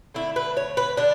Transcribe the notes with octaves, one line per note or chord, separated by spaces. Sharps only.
D3 A3 E4
B4
C#5
B4
D3 D4